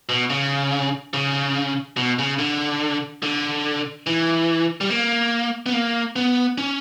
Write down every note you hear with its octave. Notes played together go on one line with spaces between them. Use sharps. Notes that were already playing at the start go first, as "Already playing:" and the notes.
B2
C#3
C#3
B2
C#3
D3
D3
E3
G3
A#3
B3
A#3
B3
C#4